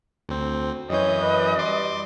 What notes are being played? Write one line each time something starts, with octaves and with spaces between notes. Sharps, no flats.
D2 C4
F#2 E3 C#5 D#5 G6
B4
G3 C6 D6